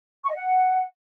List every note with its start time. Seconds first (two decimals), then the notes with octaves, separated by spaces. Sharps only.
0.24 C#6
0.29 D#5
0.35 F#5